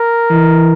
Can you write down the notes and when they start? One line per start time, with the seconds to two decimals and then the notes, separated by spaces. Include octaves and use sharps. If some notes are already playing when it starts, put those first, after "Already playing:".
Already playing: A#4
0.30 E3